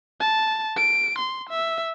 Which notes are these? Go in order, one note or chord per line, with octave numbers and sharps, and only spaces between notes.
A5
D7
C6
E5